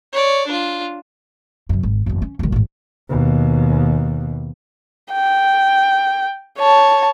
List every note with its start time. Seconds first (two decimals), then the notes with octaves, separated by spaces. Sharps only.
0.12 C#5 D5
0.47 D4 F4
1.69 F#2 C3
1.83 G#1
2.06 F#1 E2
2.22 C#4
2.39 E1 D#3
2.52 A1 G#2
3.09 D#2 B2
5.13 G5
6.58 C#5 A5